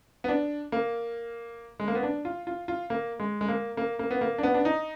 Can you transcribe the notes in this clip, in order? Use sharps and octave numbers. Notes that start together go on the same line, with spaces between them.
B3
D4
A#3
G#3
A#3
B3
D4
F4
F4
F4
A#3
G#3
G#3
A#3
A#3
A#3
B3
A#3
D4
B3
D4
D#4